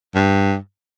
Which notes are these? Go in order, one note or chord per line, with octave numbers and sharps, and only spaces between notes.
G2